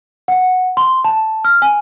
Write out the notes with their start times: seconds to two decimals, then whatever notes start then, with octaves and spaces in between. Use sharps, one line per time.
0.28 F#5
0.77 C6
1.04 A5
1.45 F6
1.62 G#5